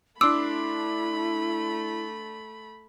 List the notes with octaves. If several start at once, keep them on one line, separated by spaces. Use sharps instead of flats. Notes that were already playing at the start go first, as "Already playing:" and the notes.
A3 D4 E4 B5 C6 D6 E6